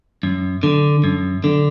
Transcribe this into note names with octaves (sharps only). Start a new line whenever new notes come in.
F#2
D3
F#2
D3